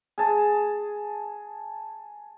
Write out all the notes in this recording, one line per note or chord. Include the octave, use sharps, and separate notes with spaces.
G#4 A5